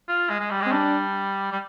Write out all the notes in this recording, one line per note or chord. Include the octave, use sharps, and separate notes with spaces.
F4
G#3
G#3
G3
G#3
C4
G3 D4
G3